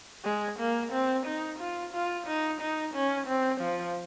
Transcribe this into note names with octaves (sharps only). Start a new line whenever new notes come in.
G#3
A#3
C4
D#4
F4
F4
D#4
D#4
C#4
C4
F3